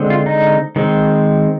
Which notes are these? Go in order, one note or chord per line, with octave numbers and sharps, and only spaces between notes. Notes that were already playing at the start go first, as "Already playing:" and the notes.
Already playing: D3 G#3 C4
F4
D#4
D#3 G#3 C4